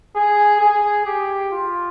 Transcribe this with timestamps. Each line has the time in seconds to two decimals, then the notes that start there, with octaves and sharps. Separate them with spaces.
0.15 G#4
0.61 G#4
1.06 G4
1.52 F4